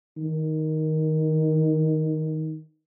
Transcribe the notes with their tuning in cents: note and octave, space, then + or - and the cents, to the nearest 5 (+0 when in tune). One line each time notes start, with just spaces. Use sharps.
D#3 +10